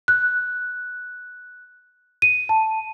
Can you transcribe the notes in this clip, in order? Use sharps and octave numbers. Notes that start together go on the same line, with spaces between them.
F#6
D#7
A5